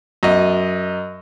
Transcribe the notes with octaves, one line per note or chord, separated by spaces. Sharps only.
F#2 D#5